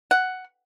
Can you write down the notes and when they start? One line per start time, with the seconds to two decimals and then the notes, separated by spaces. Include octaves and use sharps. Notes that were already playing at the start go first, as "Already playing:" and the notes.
0.11 F#5